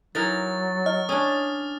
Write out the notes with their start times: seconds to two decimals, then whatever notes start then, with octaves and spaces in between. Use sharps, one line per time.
0.15 E3 F#3 D#4 A#4 A6
0.86 D#5 F6
1.09 C#4 D4 D#6